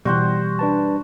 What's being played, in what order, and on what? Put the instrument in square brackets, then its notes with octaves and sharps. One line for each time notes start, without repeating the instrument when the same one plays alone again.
[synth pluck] B2 E3 [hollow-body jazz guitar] G3 [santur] F#4 C5 F#5
[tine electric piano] D4 B4 A5